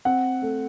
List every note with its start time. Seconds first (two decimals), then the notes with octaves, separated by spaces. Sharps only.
0.05 C4 F#5
0.42 A3